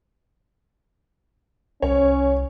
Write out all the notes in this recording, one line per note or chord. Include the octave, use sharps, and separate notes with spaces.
C2 C#4 C#5